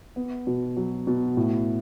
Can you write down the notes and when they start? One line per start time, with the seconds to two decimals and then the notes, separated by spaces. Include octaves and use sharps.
0.16 B3
0.47 B2
0.76 F#3
1.07 B2
1.37 A2